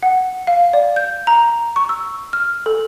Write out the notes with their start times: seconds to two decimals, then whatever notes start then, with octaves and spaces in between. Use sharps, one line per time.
0.03 F#5
0.47 F5
0.73 D5
0.96 G6
1.27 A#5
1.76 C#6
1.89 E6
2.33 F6
2.66 A4